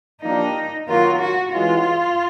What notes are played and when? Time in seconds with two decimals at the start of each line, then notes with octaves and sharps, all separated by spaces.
0.22 F3 A#3 D4 D#4 G4
0.87 D#3 F#3 A#3 F4
1.20 F#4
1.53 E3 G#3 C#4 F4 F#4